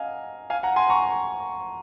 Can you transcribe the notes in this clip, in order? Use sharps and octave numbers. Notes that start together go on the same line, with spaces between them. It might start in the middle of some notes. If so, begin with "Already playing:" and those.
Already playing: D#5 F5 F#5 G#5 A#5
F5 G#5
F#5 A#5
G#5 C6
A#5 C#6